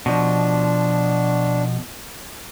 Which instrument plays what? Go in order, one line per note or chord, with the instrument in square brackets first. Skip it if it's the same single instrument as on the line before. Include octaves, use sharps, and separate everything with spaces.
[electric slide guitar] B2 F3 [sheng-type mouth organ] D4